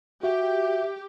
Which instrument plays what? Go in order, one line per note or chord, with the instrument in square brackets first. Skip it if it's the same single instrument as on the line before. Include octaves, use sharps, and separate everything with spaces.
[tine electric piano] F#4 [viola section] G4 [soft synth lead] E5